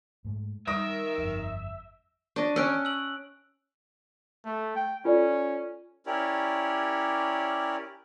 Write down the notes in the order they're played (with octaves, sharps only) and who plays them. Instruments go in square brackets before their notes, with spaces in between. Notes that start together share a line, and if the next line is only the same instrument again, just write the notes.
[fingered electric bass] G#2 A3
[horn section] D#3 A#4 [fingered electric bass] G3 [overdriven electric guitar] E5 [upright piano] D#6 A#6 D7
[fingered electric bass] G1 F2
[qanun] D4 D#5 [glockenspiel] C#6
[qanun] C#4 G5 [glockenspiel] E6 F#6 D7
[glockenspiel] E6 F#7
[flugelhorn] A3
G5
[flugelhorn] C#4 [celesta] F4 A4 D5
[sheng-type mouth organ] C#4 E4 G4 A#4 C#5 D5